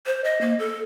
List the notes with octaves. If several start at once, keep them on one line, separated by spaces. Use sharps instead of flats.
C5
D#5
A#3
A4